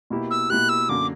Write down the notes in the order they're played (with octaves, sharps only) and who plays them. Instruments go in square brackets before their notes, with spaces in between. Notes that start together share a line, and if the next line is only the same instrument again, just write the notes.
[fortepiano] B2 A#3 E4 G4
[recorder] E6
[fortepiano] B2 A#3 E4 G4 [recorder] F#6
[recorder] E6
[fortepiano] F#2 D3 A#3 [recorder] D6